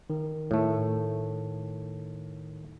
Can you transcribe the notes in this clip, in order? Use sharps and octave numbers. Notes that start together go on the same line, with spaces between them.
D#3
A2 A3